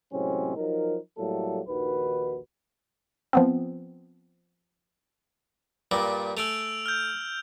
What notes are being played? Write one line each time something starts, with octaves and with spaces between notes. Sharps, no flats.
A2 C3 F#3 G#3 C4 C#4
F3 F#3 D#4 A#4
A2 F#3 G3 A3 A#3 A4
A#1 D#2 D#3 F#4 B4
F3 B3 C4
G2 A#2 G3
A3 G#5 E6 D7 F7
F6 G6